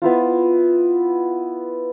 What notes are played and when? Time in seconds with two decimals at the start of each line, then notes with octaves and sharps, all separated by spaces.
0.02 B3 E4 F4